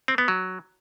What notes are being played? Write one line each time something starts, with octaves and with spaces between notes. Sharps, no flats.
C4
B3
F#3